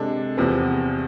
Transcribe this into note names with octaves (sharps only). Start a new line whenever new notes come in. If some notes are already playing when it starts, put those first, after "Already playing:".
Already playing: C3 G#3 D4 A4
E2 C3 F3 B3